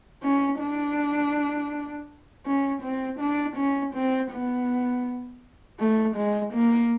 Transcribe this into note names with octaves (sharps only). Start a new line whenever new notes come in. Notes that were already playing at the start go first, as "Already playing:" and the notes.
C#4
D4
C#4
C4
D4
C#4
C4
B3
A3
G#3
A#3